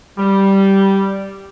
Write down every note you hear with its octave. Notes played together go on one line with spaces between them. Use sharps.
G3